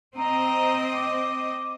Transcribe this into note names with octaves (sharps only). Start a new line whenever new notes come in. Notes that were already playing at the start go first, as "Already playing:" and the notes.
C4 D#5 A#5
D6